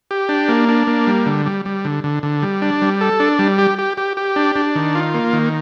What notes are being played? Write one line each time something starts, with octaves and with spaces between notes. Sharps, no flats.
G4
D4
A#3
D4
A#3
G3
D3
G3
G3
D3
D3
D3
G3
D4
G3
A4
D4
G3
G4
G4
G4
G4
D4
D4
D#3
F4
A#3
D#3